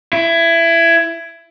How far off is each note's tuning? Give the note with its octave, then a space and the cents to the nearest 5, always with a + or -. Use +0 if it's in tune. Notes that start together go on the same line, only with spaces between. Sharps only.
E4 +20